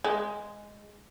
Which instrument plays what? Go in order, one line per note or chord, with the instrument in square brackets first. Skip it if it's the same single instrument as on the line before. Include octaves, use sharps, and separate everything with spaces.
[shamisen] G#3